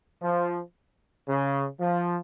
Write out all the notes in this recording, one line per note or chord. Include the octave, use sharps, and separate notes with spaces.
F3
C#3
F3